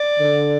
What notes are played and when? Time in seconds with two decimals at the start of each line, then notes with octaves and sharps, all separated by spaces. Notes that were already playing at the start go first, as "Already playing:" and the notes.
Already playing: D5
0.20 D3